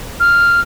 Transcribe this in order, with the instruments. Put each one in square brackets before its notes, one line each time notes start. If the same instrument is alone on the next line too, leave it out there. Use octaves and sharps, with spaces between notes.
[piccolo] F6